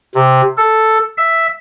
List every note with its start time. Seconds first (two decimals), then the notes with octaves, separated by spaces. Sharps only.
0.15 C3
0.57 A4
1.18 E5